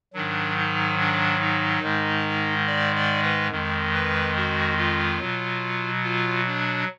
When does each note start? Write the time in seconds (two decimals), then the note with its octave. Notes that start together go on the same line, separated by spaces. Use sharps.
0.14 G#2 D#3 F#3 D4
0.57 D#4
0.99 D4
1.40 D#4
1.82 G#2 D#3 G#3
2.67 D5
2.95 D5
3.23 B4
3.51 F2 D#3 G#3
3.93 B4
4.36 F#4
4.77 F4
5.20 B2 F#3
6.03 F4
6.46 D4